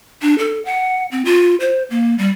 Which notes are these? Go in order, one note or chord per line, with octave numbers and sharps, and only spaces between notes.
D4
A4
F#5
C4
F4
C5
A#3
G3